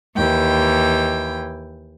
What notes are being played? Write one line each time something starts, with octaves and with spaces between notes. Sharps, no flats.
D#2 E3 G5